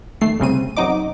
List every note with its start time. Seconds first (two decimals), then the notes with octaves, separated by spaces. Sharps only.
0.21 D#2 A3 C7
0.40 C2 C#3 C4 D#7
0.77 F#2 C3 F#3 D#4 D#5 D6